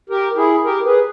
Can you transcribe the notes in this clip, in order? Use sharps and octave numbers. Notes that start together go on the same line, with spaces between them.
G4 A#4
E4 G#4
G4 A#4
G#4 B4